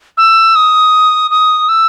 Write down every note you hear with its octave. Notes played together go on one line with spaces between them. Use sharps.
E6
D#6
D#6
E6